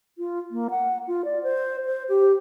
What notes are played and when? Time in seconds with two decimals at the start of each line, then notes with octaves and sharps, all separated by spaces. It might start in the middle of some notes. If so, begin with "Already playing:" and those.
0.18 F4
0.51 A#3
0.70 F#5
1.08 F4
1.25 D5
1.43 C5
1.86 C5
2.09 G4